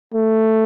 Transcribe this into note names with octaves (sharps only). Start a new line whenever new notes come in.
A3